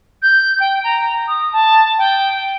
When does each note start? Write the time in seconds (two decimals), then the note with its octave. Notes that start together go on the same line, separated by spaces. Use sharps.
0.22 G6
0.60 G5
0.84 A#5
1.28 D#6
1.53 A5
1.98 G5